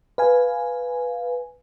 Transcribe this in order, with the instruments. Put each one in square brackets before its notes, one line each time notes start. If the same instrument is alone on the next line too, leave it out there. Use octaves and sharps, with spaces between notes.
[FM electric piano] B4 F5 G#5